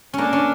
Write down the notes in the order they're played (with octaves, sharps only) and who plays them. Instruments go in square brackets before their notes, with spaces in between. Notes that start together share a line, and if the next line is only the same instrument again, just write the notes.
[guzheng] A#3 C#4 [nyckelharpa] D4
[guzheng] C#4